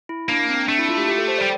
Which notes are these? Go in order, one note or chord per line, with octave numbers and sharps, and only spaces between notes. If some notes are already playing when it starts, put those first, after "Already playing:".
E4
A#3 D4
C4
A3 D4
E4
F4
G4
G4
A4
C5
G3 D5